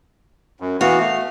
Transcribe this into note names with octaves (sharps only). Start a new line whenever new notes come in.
F#2
E3 B3 F#4 F5
A3